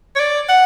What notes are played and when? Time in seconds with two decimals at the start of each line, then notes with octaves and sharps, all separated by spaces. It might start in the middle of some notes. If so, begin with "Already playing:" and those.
0.16 C#5
0.20 D5
0.49 F#5